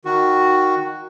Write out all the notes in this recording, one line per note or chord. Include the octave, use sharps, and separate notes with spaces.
D#3 F#4